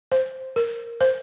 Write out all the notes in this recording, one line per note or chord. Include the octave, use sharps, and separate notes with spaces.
C5
A#4
C5